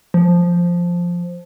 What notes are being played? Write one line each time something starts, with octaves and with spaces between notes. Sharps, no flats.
F3